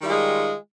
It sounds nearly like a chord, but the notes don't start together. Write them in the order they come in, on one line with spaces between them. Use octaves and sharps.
D#3 G3 F4 G#4 G#3